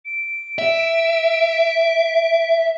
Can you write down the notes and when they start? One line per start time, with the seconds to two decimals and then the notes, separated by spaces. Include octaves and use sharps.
0.05 D7
0.59 E5